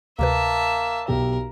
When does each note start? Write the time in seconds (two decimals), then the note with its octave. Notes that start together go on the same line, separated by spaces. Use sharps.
0.19 D2 C3 A#3 B4 E5 A5
1.08 B1 G4 A#4